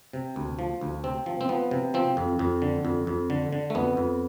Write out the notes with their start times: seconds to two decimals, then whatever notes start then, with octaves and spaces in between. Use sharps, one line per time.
0.13 C3
0.36 D2
0.59 F3
0.81 D2
1.04 C3 C4
1.26 F3
1.41 C4
1.49 F3 B3
1.71 C3
1.94 F3 C4
2.17 F2
2.39 F2
2.62 D3
2.85 F2
3.07 F2
3.30 D3
3.53 D3
3.70 A3
3.75 F2 B3
3.97 F2